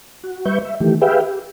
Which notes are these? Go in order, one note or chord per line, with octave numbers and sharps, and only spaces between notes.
F#4
G3 B4 E5 C#6 G6
E5
D#3 E3 A3 G4
G4 G#4 B4 E5 F5 G5
G4